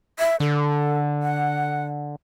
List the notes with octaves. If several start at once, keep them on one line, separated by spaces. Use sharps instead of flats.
E5
D3 A4
F#5